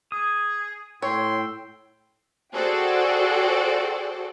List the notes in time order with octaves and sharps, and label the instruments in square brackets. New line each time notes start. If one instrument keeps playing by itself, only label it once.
[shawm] G#4 [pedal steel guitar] D#6
[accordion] A2 G5 E6 [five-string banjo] C#5 [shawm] C6
[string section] F#4 G#4 A4 C5 D5 G5